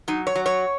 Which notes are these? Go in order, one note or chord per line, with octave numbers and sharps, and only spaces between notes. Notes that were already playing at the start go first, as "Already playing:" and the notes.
F#3 D#4
C#5
F#3
C#5